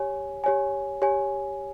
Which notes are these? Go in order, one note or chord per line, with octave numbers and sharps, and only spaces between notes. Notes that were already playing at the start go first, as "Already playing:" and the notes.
Already playing: G4 C#5 G#5
G4 C#5 G#5
G4 C#5 G#5